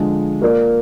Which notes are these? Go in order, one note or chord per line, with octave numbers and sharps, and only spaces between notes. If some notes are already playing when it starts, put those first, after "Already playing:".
Already playing: D3 F3 G#3
A#3 F4 A#4 D5